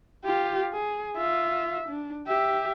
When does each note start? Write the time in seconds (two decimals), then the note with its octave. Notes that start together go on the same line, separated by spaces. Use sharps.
0.25 F4 G4
0.73 G#4
1.17 F4 E5
1.89 D4
2.27 G4 E5